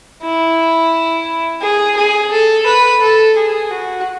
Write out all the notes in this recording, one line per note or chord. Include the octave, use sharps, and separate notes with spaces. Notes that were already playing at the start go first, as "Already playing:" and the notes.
E4
G#4
G#4
A4
B4
A4
G#4
F#4